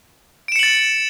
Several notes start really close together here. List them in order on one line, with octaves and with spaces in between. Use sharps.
D7 E7 C#7 F#7 A6